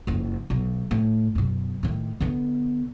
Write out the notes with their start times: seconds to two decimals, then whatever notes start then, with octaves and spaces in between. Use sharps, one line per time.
0.07 F#1 F2
0.50 B1
0.91 A2
1.35 F#2 B2
1.83 A2 D#3
2.20 D3 B3